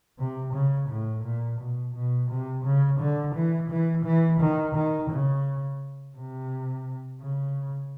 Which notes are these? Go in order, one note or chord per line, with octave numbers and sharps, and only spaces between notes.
C3
C#3
A2
A#2
B2
B2
C3
C#3
D3
E3
E3
E3
D#3
D#3
C#3
C3
C#3